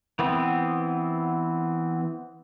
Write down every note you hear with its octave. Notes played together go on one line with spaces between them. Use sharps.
E3 B3 C4